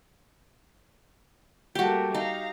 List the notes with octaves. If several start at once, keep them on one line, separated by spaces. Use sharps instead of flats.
G3 A3 A#3 F#4 G4
D#4 F5 A#5